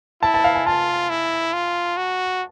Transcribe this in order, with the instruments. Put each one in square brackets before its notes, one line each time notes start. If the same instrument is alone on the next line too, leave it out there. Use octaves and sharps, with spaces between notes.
[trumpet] E4 [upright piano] A5
[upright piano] A5
F5
G#5
[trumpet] F4 [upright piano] A5
[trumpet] E4
F4
F#4